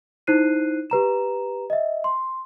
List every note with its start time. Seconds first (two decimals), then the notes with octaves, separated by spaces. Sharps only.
0.27 D#4 E4 C5 F#6 C7 D#7
0.90 G4 B4 A#5 E7
1.70 D#5 E5
2.04 C6